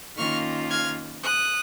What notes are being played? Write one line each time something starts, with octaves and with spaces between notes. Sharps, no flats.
D#3 A#3 C#4 F4 C#6 F6
F6 G#6
D#6 F#6